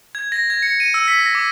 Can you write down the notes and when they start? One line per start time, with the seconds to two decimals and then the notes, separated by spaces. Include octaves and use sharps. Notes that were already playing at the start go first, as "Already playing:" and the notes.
0.15 G#6
0.32 A#6
0.50 G#6
0.62 C#7
0.80 D#7
0.94 E6
1.08 B6
1.19 A#6
1.35 D6